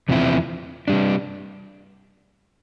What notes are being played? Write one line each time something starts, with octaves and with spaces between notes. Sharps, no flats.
E2 C3 F3 C4 E4
C3 G3 D4